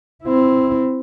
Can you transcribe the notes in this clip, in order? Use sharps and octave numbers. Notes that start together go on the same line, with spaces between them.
C4 E4